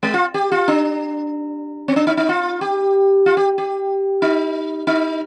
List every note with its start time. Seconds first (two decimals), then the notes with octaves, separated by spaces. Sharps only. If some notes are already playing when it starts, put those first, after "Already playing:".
0.03 G#3
0.14 F4
0.34 G4
0.52 F4
0.68 D4
1.88 C4
1.96 D4
2.07 D#4
2.17 D#4
2.29 F4
2.61 G4
3.26 F4
3.37 G4
3.58 G4
4.22 D#4
4.87 D#4